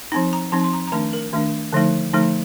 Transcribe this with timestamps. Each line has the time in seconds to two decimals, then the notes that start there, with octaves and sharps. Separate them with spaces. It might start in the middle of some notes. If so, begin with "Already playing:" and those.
0.12 F3 C4 D#4
0.33 A#5
0.52 F3 C4 D#4 A5
0.64 C6
0.73 A#5
0.87 A#5
0.92 D#3 A3 D4 A5
1.13 A#4
1.33 D#3 A3 D4
1.73 D3 F3 A3 D#4
2.13 D3 F3 A3 D#4